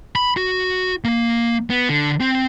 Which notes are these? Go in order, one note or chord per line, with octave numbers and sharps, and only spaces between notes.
B5
F#4
A#3
B3
D3
C4